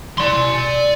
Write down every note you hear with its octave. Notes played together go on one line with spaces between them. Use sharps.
D5 C6